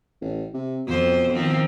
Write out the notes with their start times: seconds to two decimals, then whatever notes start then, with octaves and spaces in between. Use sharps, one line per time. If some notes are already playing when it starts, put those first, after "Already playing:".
0.21 A1
0.54 C3
0.87 F2 B2 C5
1.33 D#3 F3 C4